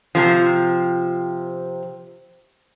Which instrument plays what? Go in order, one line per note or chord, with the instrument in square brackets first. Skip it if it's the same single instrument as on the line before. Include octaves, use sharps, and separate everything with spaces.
[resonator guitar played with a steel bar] C3 F3